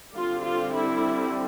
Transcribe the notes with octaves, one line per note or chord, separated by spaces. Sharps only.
D3 G3 C4 F4
F4
E4